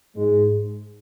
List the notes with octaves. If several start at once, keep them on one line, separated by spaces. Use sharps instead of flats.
G#2 G#3